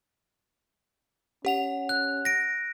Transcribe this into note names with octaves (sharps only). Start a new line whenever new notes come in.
C#4 G4 F#5 F7
F#6
A#6 D7